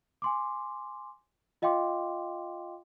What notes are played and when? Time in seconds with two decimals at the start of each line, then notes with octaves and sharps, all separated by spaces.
0.22 G#5 C6 D6
1.62 F4 D#5 F5 G5 C6 D6